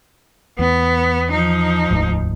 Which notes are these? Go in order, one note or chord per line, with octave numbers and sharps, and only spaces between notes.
E2 B3
F3 D#4
E1 D2 G#2